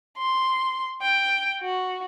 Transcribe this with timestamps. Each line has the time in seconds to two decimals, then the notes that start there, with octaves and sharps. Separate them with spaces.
0.18 C6
1.02 G5
1.62 F#4